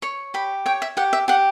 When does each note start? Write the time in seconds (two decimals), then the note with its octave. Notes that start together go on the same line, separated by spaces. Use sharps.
0.02 C#5 C#6
0.34 G4 B5
0.66 C#5 G5
0.82 E5
0.97 G4 F#5
1.13 E5
1.28 G4 F#5